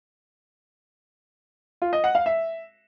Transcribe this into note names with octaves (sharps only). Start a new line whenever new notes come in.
F4
D#5
F#5
F5
E5